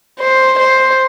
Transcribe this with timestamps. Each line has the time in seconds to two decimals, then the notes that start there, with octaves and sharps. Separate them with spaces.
0.19 C5
0.59 C5